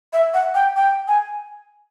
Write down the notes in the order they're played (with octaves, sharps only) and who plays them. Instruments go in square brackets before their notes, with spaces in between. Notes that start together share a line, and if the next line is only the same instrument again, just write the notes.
[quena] E5
F#5
G5
G5
G#5